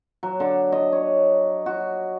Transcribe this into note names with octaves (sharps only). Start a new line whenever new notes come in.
F#3
D3
D#5
C#5
F#4